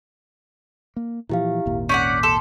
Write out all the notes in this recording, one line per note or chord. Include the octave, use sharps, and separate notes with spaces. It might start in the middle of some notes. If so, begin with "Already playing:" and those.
A#3
A#2 E3 F3 E4 G4 F5
G#1 D#2 A#2
C#4 D5 F#5 G6 B6
A4 C6